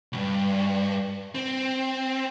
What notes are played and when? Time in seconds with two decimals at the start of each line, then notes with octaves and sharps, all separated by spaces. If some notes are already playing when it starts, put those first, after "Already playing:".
0.13 C#2 G2
1.35 C4